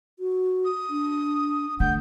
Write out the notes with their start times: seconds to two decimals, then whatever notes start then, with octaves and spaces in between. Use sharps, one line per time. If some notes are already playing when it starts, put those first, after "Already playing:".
0.19 F#4
0.65 D#6
0.90 D4
1.80 D3 A3 F#5 G6